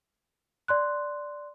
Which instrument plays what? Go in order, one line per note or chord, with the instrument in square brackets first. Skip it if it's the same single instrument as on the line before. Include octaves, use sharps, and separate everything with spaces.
[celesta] D5 C6 F#6